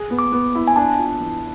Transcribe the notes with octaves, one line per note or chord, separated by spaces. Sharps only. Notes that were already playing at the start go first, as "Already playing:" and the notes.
Already playing: G#4
B3
D6
B3
E4
G#5
D4 A5
F4
E3